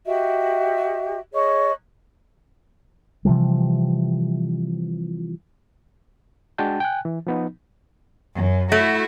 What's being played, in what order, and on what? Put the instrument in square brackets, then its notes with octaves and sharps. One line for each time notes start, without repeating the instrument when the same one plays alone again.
[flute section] F#4 G4 D#5 E5
G#4 C#5 D#5 C#6
[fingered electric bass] C3 E3 F3 G3
[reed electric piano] G#3 D4 F#4 G5 A5 G6
G5 G#5 F#6
E3
F3 B3 D#4
[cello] F#2
[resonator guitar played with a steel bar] A3 [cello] E4 F#4